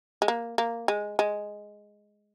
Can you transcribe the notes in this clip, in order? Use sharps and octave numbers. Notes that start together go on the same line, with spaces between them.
G#3
A#3
A#3
G#3
G#3